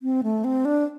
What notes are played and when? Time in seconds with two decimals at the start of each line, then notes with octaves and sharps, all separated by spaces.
0.02 C4
0.23 A3
0.44 C4
0.65 D4